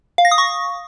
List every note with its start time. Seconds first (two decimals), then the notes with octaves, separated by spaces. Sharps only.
0.18 F5
0.25 A#6
0.31 D#6
0.38 C#6